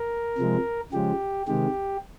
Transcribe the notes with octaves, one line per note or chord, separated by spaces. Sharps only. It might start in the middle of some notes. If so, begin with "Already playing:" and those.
Already playing: A#4
C3 F3 G#3
C#3 F3 G#3 G4
C3 D#3 G#3 G4